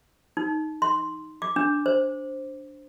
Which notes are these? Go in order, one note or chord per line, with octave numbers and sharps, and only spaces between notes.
D#4
C6
D6
D4
C5